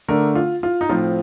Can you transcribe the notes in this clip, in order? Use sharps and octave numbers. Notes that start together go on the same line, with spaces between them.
D3 A3 D4 A#4
F4
F4
D#4
A2 F3 C4 F4